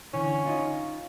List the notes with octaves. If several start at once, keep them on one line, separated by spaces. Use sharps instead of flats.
D3 E3 C#4
D#4 F4